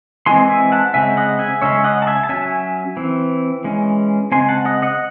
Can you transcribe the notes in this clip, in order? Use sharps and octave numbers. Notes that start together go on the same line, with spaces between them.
E3 G#3 C4 G#5 C6
E5 G#5
F#5 A5
C#3 G#3 C4 E5 G#5
D#5 F#5
E5 G#5
C#3 G#3 C#4 C#5 E5
D#5 F#5
A5
E5 G#5
A5
F#3 C#4 E5 G#5
E3 C4
E3 G#3 C#4
C#3 G#3 C4 G#5 C6
F#5 A5
D#5 F#5
D#5 F#5